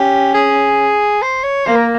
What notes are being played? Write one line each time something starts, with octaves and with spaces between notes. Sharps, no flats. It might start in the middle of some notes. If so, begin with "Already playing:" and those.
Already playing: C#4 G4
G#4
C5
C#5
A#3 C5
A#4